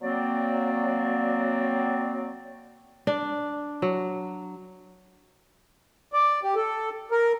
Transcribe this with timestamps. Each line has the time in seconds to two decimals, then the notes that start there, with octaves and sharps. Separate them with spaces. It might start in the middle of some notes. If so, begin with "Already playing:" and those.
0.02 F#3 A#3 C4 D5
3.07 D4
3.82 F#3
6.13 D5
6.44 G4
6.56 A4
7.11 A#4